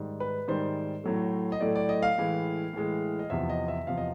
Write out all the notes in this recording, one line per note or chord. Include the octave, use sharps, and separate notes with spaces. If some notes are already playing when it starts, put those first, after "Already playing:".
Already playing: G#2 D#3 G3
B4
G#2 D#3 G3 C5
A2 F#3 A3
D#5
A2 F#3 A3 D5
D5
D#5
F5
A2 E3 G#3
A2 E3 G#3
D#5
E2 C3 F3 E5
D#5
E5
E2 C3 F3 F5
D#5